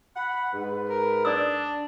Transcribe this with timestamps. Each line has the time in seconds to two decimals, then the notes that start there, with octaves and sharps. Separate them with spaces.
0.17 F#5 B5
0.53 G#2 B4
0.90 A#4
1.25 D4 D5 D#6 E6